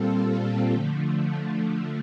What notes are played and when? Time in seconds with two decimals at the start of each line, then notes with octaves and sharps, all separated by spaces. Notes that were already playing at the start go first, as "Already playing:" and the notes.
Already playing: A#2 G3 C4 F4 A4
0.72 D3 F3 A3